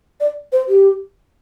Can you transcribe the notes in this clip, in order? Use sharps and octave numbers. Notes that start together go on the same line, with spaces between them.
D5
C5
G4